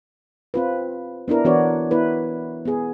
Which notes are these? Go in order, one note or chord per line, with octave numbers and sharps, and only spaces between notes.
C4 F4 B4
B3 D4 E4 A#4
E3 B3 D4 F#4 C#5 D5
B3 E4 B4
B3 G#4